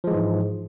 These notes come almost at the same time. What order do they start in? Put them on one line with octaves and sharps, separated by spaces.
F3 G#3 E3 G#2